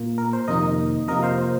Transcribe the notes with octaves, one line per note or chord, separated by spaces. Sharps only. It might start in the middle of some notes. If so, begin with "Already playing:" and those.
Already playing: A#2 A#3 F4
A#4
C5
F2 C3 D#3 A#3 D#4 A#4 D#5
C3 F3 A#3 F4 A#4 D#5
C5 F5
C5